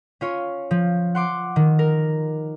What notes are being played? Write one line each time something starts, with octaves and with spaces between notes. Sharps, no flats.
C#4 F4 C#5
F3
F#5 C6 D6
D#3
A#4